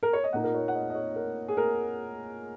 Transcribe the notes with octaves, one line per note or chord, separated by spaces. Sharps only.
A#4
C#5
D#5
A#2 A#3 D#4 F#5
A#4
C#5
F#5
D#5
D#5
C#5
A#4
G#4
A#4